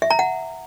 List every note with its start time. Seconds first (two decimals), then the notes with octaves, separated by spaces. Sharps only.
0.02 E5
0.11 A#5
0.19 F#5